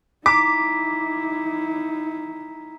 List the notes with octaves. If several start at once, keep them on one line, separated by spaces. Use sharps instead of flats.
D#4 E4 A#5 D6 B6